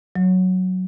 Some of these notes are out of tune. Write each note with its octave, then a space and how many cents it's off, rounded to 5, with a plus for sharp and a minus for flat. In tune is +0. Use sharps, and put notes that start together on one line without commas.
F#3 +0